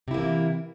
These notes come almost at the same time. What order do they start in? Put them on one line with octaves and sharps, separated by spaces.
C3 E4 A#3 E3